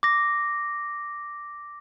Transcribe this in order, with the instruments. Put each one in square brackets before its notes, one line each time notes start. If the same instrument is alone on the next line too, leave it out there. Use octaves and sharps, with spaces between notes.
[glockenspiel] D6 A#6